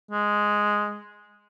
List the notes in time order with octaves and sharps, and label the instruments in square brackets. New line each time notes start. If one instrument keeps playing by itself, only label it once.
[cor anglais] G#3